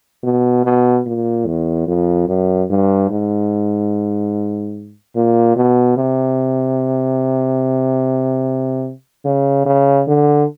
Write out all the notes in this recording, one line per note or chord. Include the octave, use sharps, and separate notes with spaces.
B2
B2
A#2
E2
F2
F#2
G2
G#2
A#2
B2
C3
C#3
C#3
D3